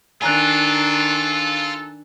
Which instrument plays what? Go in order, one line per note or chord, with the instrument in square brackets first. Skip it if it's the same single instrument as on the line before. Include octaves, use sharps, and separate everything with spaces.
[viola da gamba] D#3 D4 [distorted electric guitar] F4 [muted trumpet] A4 [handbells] G#5 A#5 F#6